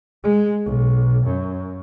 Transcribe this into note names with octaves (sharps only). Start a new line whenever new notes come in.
G#3
B1
F#2